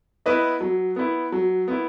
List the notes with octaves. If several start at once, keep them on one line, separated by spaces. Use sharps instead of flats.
B3 E4 B4 D#5
F#3
B3 E4
F#3
B3 E4